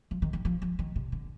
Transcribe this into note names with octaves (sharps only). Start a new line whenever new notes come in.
F3
D#3
D#3
F3
F3
D#3
C3
D3